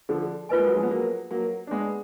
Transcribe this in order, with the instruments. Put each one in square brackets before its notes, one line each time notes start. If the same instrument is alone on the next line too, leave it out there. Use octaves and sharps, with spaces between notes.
[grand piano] D3 F3
[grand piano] A#3 [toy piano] F4 B4 D#5 G#5
[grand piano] G#3
F#3
F3 G#3
B3
F#3 A#3
F#3 A#3
D4
G#3 B3